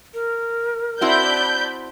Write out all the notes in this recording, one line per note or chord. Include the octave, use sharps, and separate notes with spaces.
A#4
C4 E4 F#4 D5 A5 B5 G6